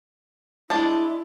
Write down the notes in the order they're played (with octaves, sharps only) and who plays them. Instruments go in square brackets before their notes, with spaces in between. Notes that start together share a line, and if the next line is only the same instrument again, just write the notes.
[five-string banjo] G#3 D4 A5 [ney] E4